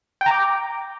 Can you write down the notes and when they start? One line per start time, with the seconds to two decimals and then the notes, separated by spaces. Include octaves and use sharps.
0.21 G5
0.26 A#5
0.31 D6